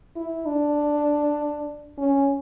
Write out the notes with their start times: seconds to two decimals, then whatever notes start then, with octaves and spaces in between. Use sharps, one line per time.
0.16 E4
0.46 D4
1.98 C#4